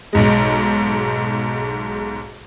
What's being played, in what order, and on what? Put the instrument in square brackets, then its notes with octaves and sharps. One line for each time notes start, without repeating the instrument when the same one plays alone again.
[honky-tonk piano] B1 G#2 G#3